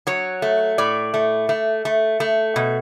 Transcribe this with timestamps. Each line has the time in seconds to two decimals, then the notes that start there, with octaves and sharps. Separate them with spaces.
0.07 F#3 C#5
0.42 A3
0.78 A2 D5
1.14 A3
1.49 A3
1.85 A3
2.20 A3
2.56 B2